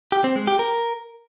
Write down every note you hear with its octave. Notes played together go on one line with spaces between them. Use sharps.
G4
C4
G#3
G4
A#4